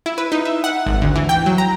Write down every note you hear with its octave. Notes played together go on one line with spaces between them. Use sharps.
E4
B4
D#4
E5
F#5
G#1
D2
E3
G5
F#3
A#5